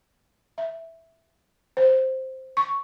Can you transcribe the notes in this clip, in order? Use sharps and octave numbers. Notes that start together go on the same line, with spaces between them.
E5
C5
C#6